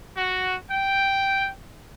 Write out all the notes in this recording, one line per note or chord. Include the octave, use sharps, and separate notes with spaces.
F#4
G5